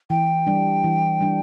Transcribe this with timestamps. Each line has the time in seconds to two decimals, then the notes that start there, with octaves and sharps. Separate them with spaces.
0.10 E3 G5
0.47 G3 D4
0.84 E3
1.21 G3 D4